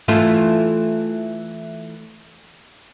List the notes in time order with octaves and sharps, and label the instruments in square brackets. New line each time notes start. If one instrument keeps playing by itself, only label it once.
[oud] E3 A3 F4